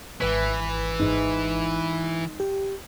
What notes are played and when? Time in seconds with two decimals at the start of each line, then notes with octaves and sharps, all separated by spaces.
0.21 G#1 E3 B4 B6
0.99 G#2
2.40 G4